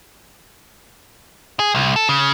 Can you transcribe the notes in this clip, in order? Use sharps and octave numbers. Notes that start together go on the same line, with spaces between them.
G#4
C2
A4
C#3